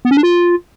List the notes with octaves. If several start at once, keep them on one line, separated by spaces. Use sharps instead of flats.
B3
C#4
D4
F4